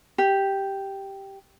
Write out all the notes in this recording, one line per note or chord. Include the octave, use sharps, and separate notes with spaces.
G4